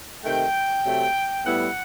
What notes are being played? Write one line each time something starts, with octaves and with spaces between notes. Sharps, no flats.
C3 D#3 A3 G5
C3 F#3 A3
A2 G3 B3 E4 F#5